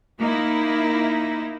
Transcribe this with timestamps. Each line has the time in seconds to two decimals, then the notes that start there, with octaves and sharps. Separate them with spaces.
0.19 A#3 D#4 E4